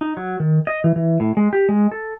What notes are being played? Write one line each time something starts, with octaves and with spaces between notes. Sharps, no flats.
D#4
F#3
D#3
D#5
E3
E3
A2
G#3
G4
G#3
A4